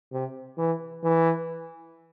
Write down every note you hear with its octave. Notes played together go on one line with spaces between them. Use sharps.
C3
E3
E3